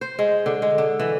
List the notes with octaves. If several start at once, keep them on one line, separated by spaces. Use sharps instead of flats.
C5
G#3
D3
G#3
D3
E3